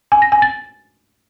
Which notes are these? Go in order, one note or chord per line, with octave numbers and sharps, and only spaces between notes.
G#5
A#6
G#5
A6